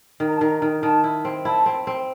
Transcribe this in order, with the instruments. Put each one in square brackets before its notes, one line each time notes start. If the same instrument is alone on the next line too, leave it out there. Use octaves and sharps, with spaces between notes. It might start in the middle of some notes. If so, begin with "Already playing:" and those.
[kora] D#3
[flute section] A#5
A5
[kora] D#3 [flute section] A#5
[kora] D#3
[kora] D#3 [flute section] A5
[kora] E4
C4
[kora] E4 [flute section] A5
[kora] C4
C4